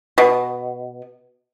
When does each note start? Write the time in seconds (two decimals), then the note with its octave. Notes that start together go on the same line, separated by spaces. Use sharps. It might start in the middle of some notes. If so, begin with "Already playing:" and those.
0.18 B2